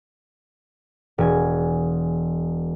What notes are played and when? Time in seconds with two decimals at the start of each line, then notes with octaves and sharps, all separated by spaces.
1.18 E1 G#5